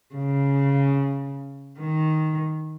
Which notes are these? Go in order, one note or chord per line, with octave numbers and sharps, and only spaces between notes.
C#3
D#3